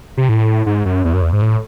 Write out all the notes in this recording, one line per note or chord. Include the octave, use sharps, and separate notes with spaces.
C3
A2
G#2
F#2
E2
F#2
E2
G#2
A2